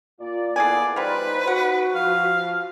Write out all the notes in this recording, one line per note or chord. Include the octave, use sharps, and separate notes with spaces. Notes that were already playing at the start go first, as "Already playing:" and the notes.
A#2 F4 D5
E3 A#3 B3 G#4 A4 D5 G#5
G3 D#4 F4 B4 C5
F#4 F#5
F3 F5